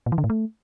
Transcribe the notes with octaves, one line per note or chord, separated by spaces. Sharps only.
A#2
E3
D3
A2
A3